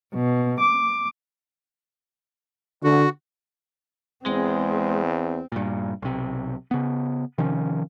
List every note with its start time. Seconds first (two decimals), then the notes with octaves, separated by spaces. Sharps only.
0.15 B2
0.61 D6
2.83 D3 F#4
4.26 E2 G#3 C4
5.52 G2 A#2
6.02 B1 C3
6.71 C#3 B3
7.38 C3 D#3 F3 C#4